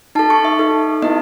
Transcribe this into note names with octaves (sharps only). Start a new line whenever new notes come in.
D#4 A4 A5
C#6
E5
D#4 A4
B3 E4 A4 D#5